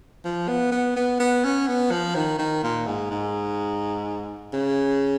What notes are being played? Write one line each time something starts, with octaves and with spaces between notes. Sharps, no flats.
F3
B3
B3
B3
B3
C#4
B3
F3
D#3
D#3
A#2
G#2
G#2
C#3